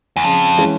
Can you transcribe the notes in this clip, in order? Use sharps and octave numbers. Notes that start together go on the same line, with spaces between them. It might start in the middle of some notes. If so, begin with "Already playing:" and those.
E2
F2 C#3
E3 G#3 C#4